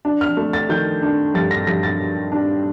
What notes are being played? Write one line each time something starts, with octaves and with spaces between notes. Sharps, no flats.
D4
F6
A3
A6
D#3 G6
D4
G2 A6
A#6
G2 A#6
A6
G2
D4